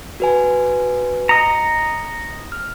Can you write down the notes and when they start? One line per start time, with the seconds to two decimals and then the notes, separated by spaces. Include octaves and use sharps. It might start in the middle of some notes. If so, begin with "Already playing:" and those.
0.20 F#4 B4 G#5
1.29 D#5 A#5 C#7
2.52 F6